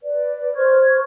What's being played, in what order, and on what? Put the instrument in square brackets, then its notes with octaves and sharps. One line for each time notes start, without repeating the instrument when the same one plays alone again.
[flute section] B4 D5
C5 C#6 F6 G#6